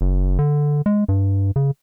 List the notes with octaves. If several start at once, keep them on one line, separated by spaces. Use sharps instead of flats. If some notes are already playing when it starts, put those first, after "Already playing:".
F#1
D3
G#3
G2
C#3